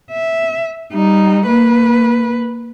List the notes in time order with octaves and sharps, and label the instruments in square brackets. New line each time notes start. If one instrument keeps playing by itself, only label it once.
[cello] E5
G3 D#4
A#3 B4